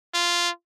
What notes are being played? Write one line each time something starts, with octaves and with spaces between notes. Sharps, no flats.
F4